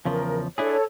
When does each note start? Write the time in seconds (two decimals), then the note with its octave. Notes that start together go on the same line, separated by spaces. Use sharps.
0.05 E2 C#3 F3 A#4
0.58 D4 E4 G#4 A4 C#5